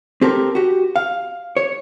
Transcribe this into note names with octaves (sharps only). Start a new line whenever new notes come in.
C4 G4 A4 A#4
F#4 G4
F5
C#5